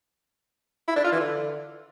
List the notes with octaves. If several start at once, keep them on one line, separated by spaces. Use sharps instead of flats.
E4
D4
F4
E3
D3